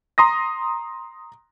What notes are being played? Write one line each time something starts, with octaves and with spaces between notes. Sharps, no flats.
A#5 C6 D#6 A#6